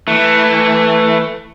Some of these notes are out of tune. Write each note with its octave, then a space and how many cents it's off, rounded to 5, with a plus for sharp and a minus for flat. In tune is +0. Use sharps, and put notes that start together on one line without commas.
E3 +0 A3 +10